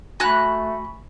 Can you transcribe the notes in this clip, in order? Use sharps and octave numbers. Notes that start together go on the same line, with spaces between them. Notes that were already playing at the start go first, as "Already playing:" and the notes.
A3 F#4 G#5 B5 F#6